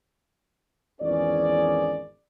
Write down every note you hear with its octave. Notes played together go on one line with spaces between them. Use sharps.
G#1 E2 C#4 G#4 D5